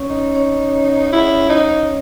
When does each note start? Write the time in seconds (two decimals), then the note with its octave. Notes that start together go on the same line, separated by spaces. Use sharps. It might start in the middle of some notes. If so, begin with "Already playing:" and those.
Already playing: C#4 C#5
0.10 D#4
0.35 C#4 C#5
1.12 E4
1.50 D#4